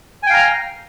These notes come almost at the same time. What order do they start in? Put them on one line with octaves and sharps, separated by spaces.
G#5 G5 F5 A#5 F6